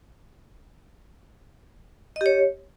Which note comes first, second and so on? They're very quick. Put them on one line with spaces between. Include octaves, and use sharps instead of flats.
D#5 G4 C#5